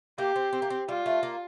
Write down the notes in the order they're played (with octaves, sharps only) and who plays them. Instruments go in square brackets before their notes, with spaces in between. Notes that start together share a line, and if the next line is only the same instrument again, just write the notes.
[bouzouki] A#3 [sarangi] G4
[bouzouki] C4
C4
A#3
C4
[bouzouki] G3 [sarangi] F4
[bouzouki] A3
A#3